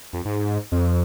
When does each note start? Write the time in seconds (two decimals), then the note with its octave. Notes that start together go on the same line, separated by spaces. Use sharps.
0.13 F2
0.25 G#2
0.72 F2